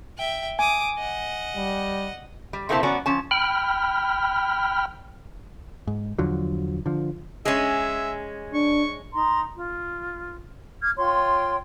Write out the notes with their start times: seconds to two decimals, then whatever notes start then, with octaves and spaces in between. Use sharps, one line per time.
0.18 E5 G5
0.59 G#5 D6 D#6
0.98 D#5 F#5
1.57 G3
2.53 G3
2.69 C3 A3 A#3 C4 E4 A5
2.83 F#3 B3 C#4 F#4 D5 A#5
3.06 F3 C#4 A5
3.31 G5 B5 F6
5.87 G#2
6.18 E2 D3 F3 F#3
6.86 D3 F3
7.45 G#3 C#4 E5
8.54 D4 C#6
9.13 D#4 A#5 C6
9.56 F4
10.82 D6 F6 G#6
10.98 F4 C#5 G5 C6